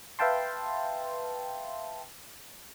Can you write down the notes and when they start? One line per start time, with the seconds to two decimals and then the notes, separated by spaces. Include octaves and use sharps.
0.19 B4 E5 F5 G5 A5 C6